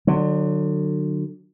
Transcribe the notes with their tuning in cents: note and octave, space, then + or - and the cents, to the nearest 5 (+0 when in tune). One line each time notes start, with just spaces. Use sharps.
D3 +30 F#3 +0